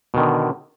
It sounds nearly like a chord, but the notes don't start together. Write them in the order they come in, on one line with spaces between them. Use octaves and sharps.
B2 D#3 D3